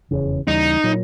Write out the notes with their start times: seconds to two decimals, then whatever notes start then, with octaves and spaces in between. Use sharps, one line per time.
0.11 F1 E2 C#3
0.47 D#2 C#3 E3 G3 D#4
0.83 A#2 F#3